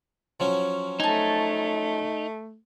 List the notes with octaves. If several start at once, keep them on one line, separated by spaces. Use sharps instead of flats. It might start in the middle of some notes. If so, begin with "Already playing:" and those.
F3 F#3 C#4
A3 D#4 G#5 A5